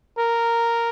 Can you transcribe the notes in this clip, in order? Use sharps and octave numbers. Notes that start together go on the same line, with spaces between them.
A#4